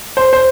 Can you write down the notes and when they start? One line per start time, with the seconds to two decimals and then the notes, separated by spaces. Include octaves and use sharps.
0.17 C5
0.33 C5